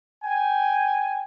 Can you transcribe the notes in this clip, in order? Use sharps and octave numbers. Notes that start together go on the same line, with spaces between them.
G5 G#5